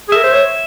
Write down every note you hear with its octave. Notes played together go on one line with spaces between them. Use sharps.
G#4
A#4 E5
C5
C#5